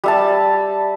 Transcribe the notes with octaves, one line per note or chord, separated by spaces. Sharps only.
G3 E5 A5